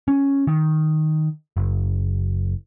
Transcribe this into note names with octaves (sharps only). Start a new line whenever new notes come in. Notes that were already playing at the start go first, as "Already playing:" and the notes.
C#4
D#3
F#1